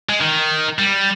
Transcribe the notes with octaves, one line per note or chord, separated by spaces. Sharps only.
G#3
D#3
G3